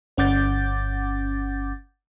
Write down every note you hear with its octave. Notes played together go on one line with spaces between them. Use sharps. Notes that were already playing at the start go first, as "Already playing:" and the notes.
G1 C#4 F#5 D6 G6 A6